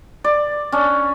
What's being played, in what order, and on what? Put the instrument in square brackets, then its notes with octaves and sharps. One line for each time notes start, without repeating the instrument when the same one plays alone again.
[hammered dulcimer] D5
C#4 D4